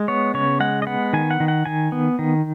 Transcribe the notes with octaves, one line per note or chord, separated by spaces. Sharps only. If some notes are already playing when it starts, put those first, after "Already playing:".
Already playing: G#3
B3 C#5
C#3 C#5
G#3 F#5
D#5
B3 F#5
D#3 G#5
F#5
D#3
F#5
D#3 G#5
B3
D#3